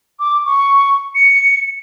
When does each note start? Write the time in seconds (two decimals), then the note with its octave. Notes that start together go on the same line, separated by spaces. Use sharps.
0.19 D6
0.45 C#6
1.15 C#7